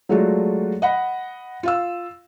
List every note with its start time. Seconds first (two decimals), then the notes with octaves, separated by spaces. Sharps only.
0.09 F#3 G#3 A3 D4 F4 F#4
0.82 D#5 F#5 B5
1.63 F4 F5 E6